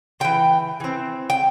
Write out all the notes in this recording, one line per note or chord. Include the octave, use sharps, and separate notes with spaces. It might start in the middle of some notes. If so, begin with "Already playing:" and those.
E3 C4 G5
E3 C4
G5